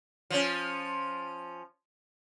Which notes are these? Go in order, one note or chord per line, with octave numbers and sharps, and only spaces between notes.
F3 C#4